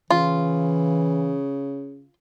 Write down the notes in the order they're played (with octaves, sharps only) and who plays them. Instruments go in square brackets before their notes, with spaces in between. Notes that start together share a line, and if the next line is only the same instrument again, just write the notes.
[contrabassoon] C#3 [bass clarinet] E3 [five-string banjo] F4